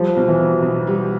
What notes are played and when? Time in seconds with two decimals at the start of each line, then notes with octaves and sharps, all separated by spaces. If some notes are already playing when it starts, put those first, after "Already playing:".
Already playing: F3 G3
0.17 B1
0.28 E3
0.39 B2
0.63 B1
0.87 G3